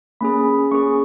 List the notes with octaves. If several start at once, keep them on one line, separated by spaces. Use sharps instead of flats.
A#3 C#4 G#4 B5
A#3 C#4 G#4 C#6